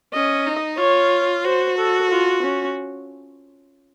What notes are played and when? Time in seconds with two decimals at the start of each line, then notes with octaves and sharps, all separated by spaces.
0.13 C#4 D#5
0.46 D#4
0.78 F4 C#5
1.44 F#4 C5
1.77 A4
2.10 F4
2.42 C#4